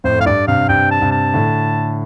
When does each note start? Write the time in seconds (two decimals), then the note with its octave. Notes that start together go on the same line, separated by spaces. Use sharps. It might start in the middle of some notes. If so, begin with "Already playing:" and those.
0.04 F2 A2 C5
0.19 A2 F5
0.26 G2 D5
0.48 G2 C3 F5
0.69 G2 C3 G5
0.91 A5
1.01 G2 C3
1.12 A5
1.34 A2 D3